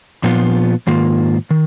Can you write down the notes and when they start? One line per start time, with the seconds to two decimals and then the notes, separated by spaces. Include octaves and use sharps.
0.23 A#2 F3 B3 F4
0.87 G#2 D#3 A#3 F4
1.51 D#3